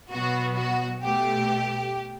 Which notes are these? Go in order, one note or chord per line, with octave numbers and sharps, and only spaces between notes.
B2 F#3 B3 F#4
F#4
B2 A3 G4